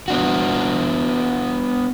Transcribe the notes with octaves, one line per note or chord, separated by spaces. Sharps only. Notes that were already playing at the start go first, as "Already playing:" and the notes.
B3 D4 F#4